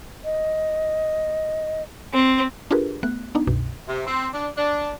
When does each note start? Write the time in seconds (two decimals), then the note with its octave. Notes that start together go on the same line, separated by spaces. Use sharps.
0.24 D#5
2.13 C4
2.71 D4 F4 G4 G#4 A#4 B4
3.03 A3 B3 F#6
3.35 B3 D4 D#4
3.47 C2 F#2 B2
3.88 C3
4.07 C4
4.33 D4
4.57 D4